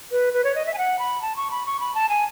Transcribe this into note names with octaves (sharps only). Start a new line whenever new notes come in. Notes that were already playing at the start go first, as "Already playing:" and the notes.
B4
B4
C#5
D#5
E5
G#5
F#5
B5
A5
C#6
B5
C#6
B5
A5
G#5